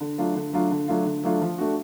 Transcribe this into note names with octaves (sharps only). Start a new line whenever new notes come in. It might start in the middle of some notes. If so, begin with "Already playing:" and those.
D3
F#3 A3 D4 F4
D3
F#3 A3 D4 F4
D3
F#3 A3 D4 F4
D3
F#3 A3 D4 F4
F3
A3 D4 F#4